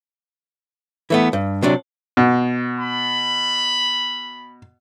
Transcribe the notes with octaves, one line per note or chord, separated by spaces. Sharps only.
E3 A3 B3
G2
C3 F#3 D4
B2
B5